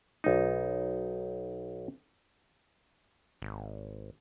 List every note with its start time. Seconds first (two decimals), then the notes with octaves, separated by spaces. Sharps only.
0.24 B1 D#4
3.42 G#1